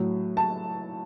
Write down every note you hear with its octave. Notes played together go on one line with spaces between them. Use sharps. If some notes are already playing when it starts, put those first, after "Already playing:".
Already playing: A2 F#3
A5